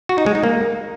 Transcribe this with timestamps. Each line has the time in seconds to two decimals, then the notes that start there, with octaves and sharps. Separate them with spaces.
0.09 F#4
0.18 D#4
0.26 G#3
0.35 D#4
0.44 A#3